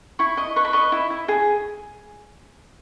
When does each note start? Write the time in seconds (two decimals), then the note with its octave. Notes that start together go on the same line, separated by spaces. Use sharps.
0.19 E4 C#6
0.37 D#5 C#6
0.56 B4 C#6
0.65 B5
0.73 D#5 C#6
0.92 E4
1.10 E4
1.28 G#4